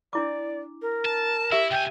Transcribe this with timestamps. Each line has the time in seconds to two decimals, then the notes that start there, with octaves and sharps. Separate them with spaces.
0.13 D4 E4 D5 D6
0.82 A#4
1.05 A5
1.52 E4 G4 E5 E6
1.71 C#2 G5 G#5